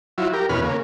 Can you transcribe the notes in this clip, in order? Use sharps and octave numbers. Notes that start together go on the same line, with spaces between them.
F#3 E4 F4
G4 A#4
E2 B2 C#4 B4 F6
C#3 A#3